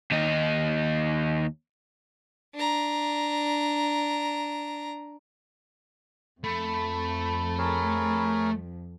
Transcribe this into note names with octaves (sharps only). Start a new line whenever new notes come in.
D#2 D#4
D4 A#5
F2 A3 B5
G#4 A#4 C#5